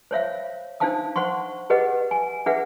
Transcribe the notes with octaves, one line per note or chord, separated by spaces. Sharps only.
C5 C#5 E5 F5
D4 D#4 C5 F5 A5 D#6
C5 F#5 C6 C#6
G4 G#4 B4 D#5 F#5
G#5
D4 G#4 B4 E5 F#5